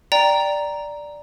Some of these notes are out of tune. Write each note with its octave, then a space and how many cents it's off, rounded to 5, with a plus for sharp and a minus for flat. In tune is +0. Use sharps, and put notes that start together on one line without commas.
D5 +0 G5 +0 A#5 +0